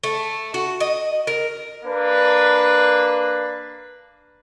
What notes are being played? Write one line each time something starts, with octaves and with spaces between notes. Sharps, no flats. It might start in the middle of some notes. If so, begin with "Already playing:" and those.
A3
F#4
D#5
A#4
A#3 D4 B4